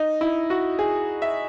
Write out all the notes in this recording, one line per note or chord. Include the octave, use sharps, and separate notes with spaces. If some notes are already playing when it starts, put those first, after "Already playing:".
Already playing: D#4
E4
F#4
G#4
E5